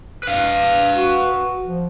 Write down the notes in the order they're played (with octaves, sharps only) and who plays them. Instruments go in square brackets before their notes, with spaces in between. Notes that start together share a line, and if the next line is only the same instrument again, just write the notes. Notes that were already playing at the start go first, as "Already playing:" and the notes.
[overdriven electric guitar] B4 F5
[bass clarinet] F#4
F3